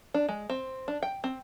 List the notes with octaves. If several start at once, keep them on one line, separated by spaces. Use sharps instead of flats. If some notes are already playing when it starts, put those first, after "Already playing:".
D4
G#3
C4
D4
G5
C4